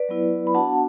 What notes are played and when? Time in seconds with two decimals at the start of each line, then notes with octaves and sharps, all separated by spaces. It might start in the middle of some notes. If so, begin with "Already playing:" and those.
Already playing: B4 D5
0.09 F#3 B3 E4
0.47 B5
0.54 B3 D4 F#4 F#5 A5